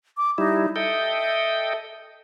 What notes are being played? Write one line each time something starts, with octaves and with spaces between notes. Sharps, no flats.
D6
G3 D#4 E4
A4 D#5 E5 G5